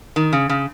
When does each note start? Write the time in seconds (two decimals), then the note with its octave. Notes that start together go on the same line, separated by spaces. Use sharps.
0.16 D#3
0.33 C#3
0.49 C#3